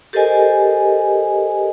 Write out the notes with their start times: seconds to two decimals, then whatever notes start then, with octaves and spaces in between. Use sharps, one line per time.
0.13 G4 A4 A#4 C5 D#5 G#5